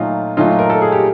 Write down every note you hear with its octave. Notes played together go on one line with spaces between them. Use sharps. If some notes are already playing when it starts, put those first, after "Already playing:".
Already playing: A#2 F#3 A3 D#4 F4
A#2 F#3 A3 D#4 F4
A#4
A4
G#4
G4